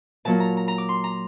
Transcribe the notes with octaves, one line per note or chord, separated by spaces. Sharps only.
A#2 F#3 A#3 A5
A#5
A#5
A#5
D6
C6
A#5